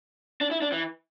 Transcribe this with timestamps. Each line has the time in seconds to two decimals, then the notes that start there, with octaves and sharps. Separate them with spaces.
0.41 D4
0.51 E4
0.62 D4
0.72 E3